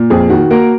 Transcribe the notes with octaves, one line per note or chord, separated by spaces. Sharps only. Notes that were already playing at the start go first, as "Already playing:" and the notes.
Already playing: A#2
F2 G#4
D#3 F#4
A#3 F#4 A#4